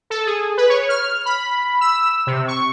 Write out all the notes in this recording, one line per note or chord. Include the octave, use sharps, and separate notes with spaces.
A4
G#4
B4
C#5
F6
B5
E6
C3
C#6